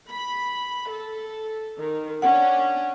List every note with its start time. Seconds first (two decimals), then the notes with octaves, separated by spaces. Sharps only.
0.10 B5
0.90 A4
1.78 D#3
2.22 C#4 D4 F#5